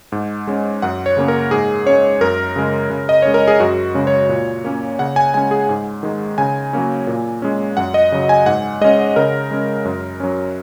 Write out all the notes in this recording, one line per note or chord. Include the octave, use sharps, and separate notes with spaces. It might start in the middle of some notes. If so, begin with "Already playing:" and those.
G#2
G#3 C#4
F#2 F#5
C#5
C#3 A#3 C#4
A#4
G#2 G#4
G#3 C#4 C#5
F#2 A#4
C#3 G#3
C#3
D#5
G#3 C#4 C#5
A#4
G#4
F#2 F#4
C#3 G#3 C#4
C#5
A#2
A#3 C#4
C#3 F#5
G#5
G#3 C#4 G#5
G#4
G#2
D#3 G#3
C#3 G#5
F#3 A#3 C#4
A#2
G#3 C#4
F#2 F#5
D#5
C#3 F#3
G#5
G#2 F#5
G#3 C#4 D#5
C#3 A#4
G#3 C#4
F#2
F#3 C#4